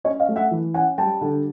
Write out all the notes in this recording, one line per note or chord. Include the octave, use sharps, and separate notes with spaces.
C#4 C#5 D#5
D#5 F5
A3
E5 F#5
E3
C#4 F#5 G#5
G3 G5 A5
D3